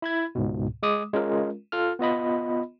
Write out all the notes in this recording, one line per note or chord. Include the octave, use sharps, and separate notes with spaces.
E4 B5 G#6
C#2 G#2 B2
G#3 D6 D#6
G#3 C#4 F4 A#4
F4 A4 F6
B3 F4 D#5 B5